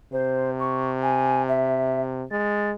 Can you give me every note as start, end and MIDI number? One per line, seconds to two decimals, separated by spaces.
0.12 2.24 48
0.12 0.51 72
0.60 0.90 85
1.02 1.43 80
1.48 2.02 76
2.31 2.74 56
2.31 2.70 93